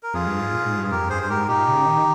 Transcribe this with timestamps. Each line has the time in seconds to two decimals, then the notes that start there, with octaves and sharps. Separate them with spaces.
0.03 A#4
0.14 F2 F4 G#4
0.27 G2
0.40 G#2
0.53 A#2
0.65 G#2
0.78 G2
0.84 G#4
0.91 F2 G4 A#4
1.10 G2 G#4 C5
1.23 C5
1.29 G#2 G4 A#4
1.48 A#2 D#4 G4
1.68 C#3
1.86 D#3